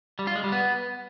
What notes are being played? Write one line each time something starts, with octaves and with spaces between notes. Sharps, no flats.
G3
F4
G#3
G3
B3